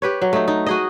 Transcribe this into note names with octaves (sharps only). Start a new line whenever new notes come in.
G4 B4 C#5
F#3
A3 D#4
D#4
F#4 G#4 D#5